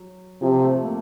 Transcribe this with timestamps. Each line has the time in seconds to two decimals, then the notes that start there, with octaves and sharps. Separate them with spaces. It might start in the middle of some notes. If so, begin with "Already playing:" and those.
Already playing: F#3
0.42 C3 F3
0.63 A3
0.84 A#3